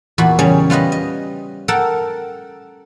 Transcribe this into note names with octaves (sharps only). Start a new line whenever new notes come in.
E2 A#2 F#4 B5
C#3 G3 C#4 G#4
G3 F4 B4 D#5
D#5
A4 A#4 F#5 G5 A5 A#5